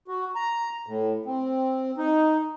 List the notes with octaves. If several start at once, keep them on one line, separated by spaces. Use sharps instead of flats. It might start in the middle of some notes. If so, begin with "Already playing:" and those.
F#4
A#5
A2
C4
D#4